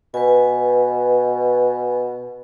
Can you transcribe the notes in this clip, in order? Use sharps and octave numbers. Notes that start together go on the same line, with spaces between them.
B2 B4 G#5